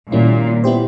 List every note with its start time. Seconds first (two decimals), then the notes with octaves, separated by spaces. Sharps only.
0.12 A#2 D#3 G3 A#3 C#4 E4
0.64 B3 E4 G4 C5